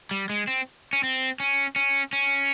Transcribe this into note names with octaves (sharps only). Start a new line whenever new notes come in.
G3
G#3
C4
C#4
C4
C#4
C#4
C#4